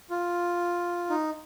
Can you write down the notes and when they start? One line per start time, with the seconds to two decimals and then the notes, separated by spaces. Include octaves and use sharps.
0.10 F4
1.10 D#4